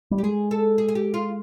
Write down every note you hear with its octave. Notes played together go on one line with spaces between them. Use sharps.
G3
G4
G#3 G#4
A4
G#4
G#4
G4
F4